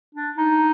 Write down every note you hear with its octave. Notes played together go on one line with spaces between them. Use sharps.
D4
D#4